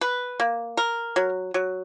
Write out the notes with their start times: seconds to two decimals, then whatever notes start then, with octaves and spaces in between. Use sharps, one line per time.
0.01 B4
0.40 A#3
0.77 A#4
1.16 F#3
1.54 F#3